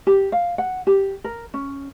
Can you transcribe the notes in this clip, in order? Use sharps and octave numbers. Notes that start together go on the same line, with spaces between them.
G4
F5
F#5
G4
A#4
C#4